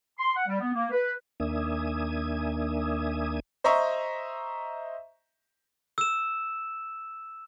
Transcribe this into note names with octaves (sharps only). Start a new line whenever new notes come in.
C6
F#5
G3
B3
A#3
B4
D#2 A#3 D4 E5 G#5 D#6
C5 D#5 E5 A#5 C#6
E6 E7